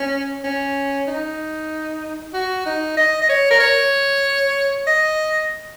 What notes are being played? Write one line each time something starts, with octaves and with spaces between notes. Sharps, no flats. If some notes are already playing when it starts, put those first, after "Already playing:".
Already playing: C#4
C#4
D#4
F#4
D#4
D#5
D#5
C#5
A#4
C#5
D#5